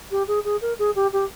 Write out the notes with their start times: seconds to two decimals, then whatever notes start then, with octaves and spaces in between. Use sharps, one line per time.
0.11 G4
0.27 G#4
0.44 G#4
0.61 A#4
0.79 G#4
0.95 G4
1.12 G4